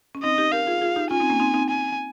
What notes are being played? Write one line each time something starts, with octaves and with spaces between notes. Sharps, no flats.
C#4
C4 D#4 D#5
D#4 G4
G4 A#4 F5
F4 G#4
F4 G#4
D#4 G4
C#4 F4 G#5
C4 D#4
A#3 C#4
C4 D#4
C4 D#4
G#5